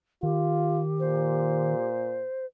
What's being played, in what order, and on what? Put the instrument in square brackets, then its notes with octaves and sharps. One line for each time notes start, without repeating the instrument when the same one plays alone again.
[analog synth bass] D#3 [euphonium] F4 [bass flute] G4
[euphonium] A#2 [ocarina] C5